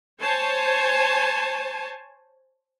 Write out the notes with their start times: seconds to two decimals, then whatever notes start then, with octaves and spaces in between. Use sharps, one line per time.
0.21 C5 C#5 G#5 A5